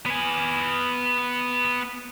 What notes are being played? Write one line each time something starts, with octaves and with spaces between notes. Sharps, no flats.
B3 G#5